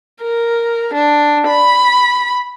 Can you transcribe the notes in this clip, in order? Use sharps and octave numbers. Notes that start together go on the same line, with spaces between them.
A#4
D4
B5